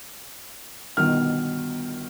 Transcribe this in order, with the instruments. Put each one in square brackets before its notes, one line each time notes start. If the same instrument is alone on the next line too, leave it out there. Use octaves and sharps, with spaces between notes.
[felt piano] G1 B2 D#3 F6